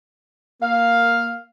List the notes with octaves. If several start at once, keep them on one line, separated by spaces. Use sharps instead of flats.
A#3 F5